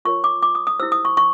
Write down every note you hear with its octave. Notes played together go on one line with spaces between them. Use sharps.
F4 A#4 C#5 C#6
D6
D6
D#6
D#6
E4 G4 C5 E6
D#6
C#6
C#6